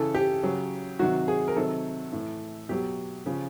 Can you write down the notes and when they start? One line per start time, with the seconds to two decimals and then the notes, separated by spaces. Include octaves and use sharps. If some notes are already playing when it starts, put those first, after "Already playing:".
Already playing: C#3 E3 A4
0.14 G4
0.43 C#3 F#3
0.99 C3 D#3 F#3 F#4
1.28 G#4
1.48 A#4
1.56 C3 D#3 F#3 A4
2.12 A2 E3
2.69 B2 F#3 G4
3.26 C#3 F3